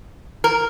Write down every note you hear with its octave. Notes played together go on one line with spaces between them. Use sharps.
A#4